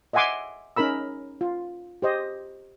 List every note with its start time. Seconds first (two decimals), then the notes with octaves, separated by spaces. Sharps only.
0.13 D#5 E5 F#5 G#5 C6 D6
0.76 C#4 D#4 A#4 B5 E6
1.41 F4
2.02 G4 C5 D#5